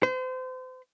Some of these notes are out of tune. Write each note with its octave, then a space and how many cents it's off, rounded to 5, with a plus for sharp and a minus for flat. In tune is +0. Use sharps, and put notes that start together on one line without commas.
C5 -35